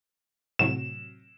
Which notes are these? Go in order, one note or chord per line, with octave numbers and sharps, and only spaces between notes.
A2 C3 F#3 E7